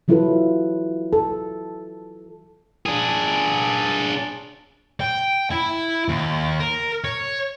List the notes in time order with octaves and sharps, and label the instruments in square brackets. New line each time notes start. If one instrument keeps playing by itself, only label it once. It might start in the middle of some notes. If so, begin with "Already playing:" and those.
[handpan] E3 F#3 E4 F4 A4 B4
A4
[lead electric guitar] D4 G#4
[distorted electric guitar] G5
E4
D#2
A#4
C#5